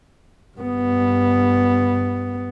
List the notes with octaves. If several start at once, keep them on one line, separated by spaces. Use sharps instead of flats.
G2 B3